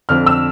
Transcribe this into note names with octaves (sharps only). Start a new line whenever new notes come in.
F2 D3 F3 F6
E6